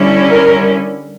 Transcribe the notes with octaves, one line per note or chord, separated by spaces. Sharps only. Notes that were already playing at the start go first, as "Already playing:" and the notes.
Already playing: D3 G3 C#4 E4
A#4